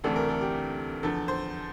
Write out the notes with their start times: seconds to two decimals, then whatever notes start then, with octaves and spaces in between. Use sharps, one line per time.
0.04 D2 C3 E3 A3 D4 A4
0.16 A#4
0.29 A4
0.41 G4
1.03 E2 D3 F3 A4
1.28 C5